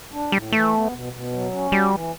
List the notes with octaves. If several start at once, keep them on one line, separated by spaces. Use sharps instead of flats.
D4
A2 G3
E3 A3
B3
B2
B2
F#3
C#4
G3 F#4
E3